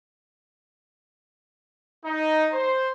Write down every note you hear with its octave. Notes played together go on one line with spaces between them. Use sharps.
D#4
C5